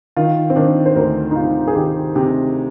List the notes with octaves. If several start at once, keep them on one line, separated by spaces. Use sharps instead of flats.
D#3 F4
C4
D#3 D4
C5
D2 A#4
D#4
C3 F4
G#4
D#3 G4
C3 G4